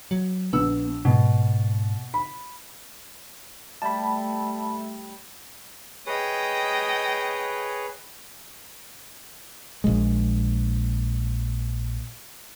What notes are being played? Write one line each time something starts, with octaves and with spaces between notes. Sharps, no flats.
F#3
A#1 B3 E6
G#2 B2
B5
G3 A3 E5 A5 B5
G#4 B4 C#5 D#5 G5
A#1 G#3